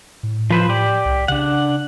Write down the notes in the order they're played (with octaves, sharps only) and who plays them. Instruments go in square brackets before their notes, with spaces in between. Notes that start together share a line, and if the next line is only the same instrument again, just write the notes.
[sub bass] A2
[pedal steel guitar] F3 B4 C5
G4 D5
[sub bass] C2
[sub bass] C#3 [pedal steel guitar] D4 F#5